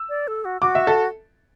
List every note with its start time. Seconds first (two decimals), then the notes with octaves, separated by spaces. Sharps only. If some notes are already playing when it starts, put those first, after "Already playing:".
Already playing: E6
0.09 D5
0.28 A4
0.45 F#4
0.62 F#4 D6
0.75 E5
0.87 A4